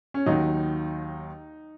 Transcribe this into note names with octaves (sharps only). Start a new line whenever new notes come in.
C#4
D#2 D#3 F#3 D#4